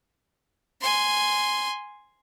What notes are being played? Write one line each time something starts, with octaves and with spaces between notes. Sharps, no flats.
G#5 C6